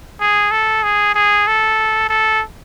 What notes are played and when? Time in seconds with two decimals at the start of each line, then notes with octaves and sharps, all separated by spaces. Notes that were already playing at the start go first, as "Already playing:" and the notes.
0.21 G#4
0.51 A4
0.83 G#4
1.15 G#4
1.47 A4
2.09 A4